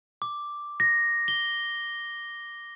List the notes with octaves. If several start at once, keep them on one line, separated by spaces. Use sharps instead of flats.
D6
A#6
G7